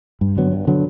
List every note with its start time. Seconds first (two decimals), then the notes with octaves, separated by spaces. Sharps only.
0.21 G2
0.37 D3 F#3 B3
0.52 G2
0.67 D3 F#3 B3